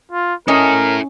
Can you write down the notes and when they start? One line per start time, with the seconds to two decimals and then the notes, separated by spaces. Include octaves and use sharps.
0.11 F4
0.48 C#4 E4 A4 A#4 D#5